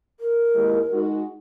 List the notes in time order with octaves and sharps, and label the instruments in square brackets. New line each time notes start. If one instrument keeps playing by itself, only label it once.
[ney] A#4
[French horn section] D#2 G#3 E4
G#3 D#4 F#4